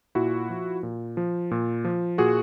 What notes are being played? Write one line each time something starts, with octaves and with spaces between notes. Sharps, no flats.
A#2 E4 F#4
F3
A#2
F3
A#2
F3
A#2 F#4 G#4